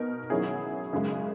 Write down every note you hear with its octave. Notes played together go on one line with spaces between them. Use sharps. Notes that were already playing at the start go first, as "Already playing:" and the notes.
Already playing: B2 D#4 A#4
D#3 F#3 C#4 E4 G#4
F#2 C#3 G#3